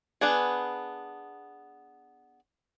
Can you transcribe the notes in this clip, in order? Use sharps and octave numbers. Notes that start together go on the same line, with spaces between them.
B3 D4 G#4